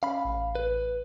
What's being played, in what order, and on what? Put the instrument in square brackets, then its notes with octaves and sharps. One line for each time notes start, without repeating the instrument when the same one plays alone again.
[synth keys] C#4 [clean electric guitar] F5 B5
[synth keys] A1
[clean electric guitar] B4